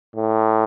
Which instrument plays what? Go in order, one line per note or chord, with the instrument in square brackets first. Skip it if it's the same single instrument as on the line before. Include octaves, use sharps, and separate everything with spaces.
[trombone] A2